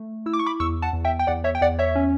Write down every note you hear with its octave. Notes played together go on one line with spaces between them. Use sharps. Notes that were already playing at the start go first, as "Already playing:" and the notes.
Already playing: A3
E4 E6
D6
C#6
B5 D6
E2 C#6 E6
F#5 A5
E2
E5 G5
G5
E2 D5 F#5
C#5 E5
G5
E2 D5 F#5
C#5 E5
C#4